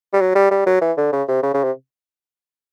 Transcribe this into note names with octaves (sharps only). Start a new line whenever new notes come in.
G3
F#3
G3
G3
F#3
E3
D3
C#3
C3
C#3
C#3
C3